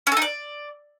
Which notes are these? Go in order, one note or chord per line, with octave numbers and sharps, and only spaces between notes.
C#4
A4
D#4
D5